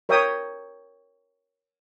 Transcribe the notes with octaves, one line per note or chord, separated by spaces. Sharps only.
A#4 C#5 E5 G5 D#6